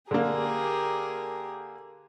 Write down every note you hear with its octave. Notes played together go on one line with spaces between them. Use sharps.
D3 A#3 G4 G#4 A#4